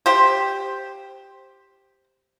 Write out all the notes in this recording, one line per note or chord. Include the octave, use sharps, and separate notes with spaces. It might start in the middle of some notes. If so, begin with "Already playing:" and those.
G4 C5